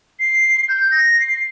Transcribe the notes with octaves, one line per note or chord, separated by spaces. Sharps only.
C7
G6
A#6
C7